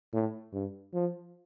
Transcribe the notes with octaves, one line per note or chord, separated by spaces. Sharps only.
A2
G2
F3